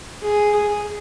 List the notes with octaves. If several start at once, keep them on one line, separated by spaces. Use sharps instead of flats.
G#4